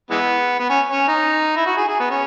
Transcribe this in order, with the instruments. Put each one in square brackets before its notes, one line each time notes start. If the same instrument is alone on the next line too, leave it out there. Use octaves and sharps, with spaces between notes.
[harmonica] E3 G#3 B3
B3
C#4
C#4
D#4
E4
F#4
G#4
G#4
B3
C#4